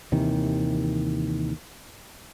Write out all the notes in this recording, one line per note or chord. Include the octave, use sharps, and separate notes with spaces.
D#2 C3 D#3 E3